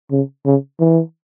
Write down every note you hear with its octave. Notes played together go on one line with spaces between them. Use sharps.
C#3
C#3
E3